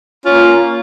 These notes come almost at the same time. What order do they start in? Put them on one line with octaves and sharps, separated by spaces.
F4 C#4 A#3